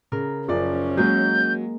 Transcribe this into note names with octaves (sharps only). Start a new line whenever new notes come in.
C#3 A#4
F#1 F3 C#4 D5
F#3 G#3 A#3 G6